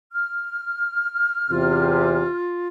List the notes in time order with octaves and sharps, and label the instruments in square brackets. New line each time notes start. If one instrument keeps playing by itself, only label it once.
[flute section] F6
[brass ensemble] E2 C3 [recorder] F4